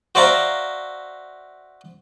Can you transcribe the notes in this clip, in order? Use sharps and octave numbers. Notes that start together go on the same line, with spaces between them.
F#4 C5 D5 E5 F5 A#5